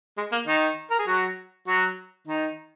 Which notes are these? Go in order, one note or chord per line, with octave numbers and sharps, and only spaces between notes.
G#3
A#3
D#3 D#4
A#4
G#4
F#3 F#4
F#3 F#4
D#3 D#4